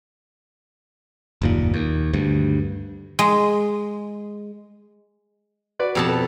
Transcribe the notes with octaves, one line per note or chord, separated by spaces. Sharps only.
F#1 D#2 A#2
D#2
D2 G2
G#3
F#4 B4 D5
F2 B2 G4 A5 E6
A4 B4